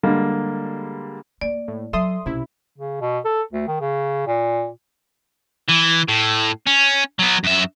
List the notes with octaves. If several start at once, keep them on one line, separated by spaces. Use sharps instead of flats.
D3 G3 G#3 A#3
A#3 D5
A2
F#3 A4 E5 C6 D#6
B1 C3 C#4 E4
C#3
B2
A4
D2
D#3
C#3
A#2
E3
A2
C#4
F#3 B3
F#2 E5